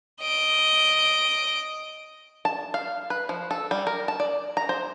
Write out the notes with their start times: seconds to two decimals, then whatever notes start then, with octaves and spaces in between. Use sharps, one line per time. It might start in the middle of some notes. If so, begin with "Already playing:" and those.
0.21 D#5 D7
2.45 A5
2.74 F5
3.10 B4
3.29 F3
3.51 A4
3.71 G3
3.87 A#4
4.08 A5
4.20 D5
4.57 A#5
4.69 C5